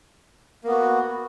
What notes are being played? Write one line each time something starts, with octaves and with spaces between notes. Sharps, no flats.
A#3 B3 F#4